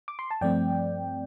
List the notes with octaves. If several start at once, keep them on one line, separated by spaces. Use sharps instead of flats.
D6
C6
A5
G2 F3 A3 C4 D5 G5